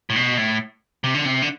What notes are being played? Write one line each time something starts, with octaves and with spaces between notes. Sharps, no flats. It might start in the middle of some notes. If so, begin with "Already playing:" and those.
A2
B2
A2
C3
D3
C3
D3